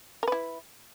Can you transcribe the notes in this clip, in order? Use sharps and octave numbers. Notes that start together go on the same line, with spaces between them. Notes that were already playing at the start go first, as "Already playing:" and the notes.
E4 A#4 B4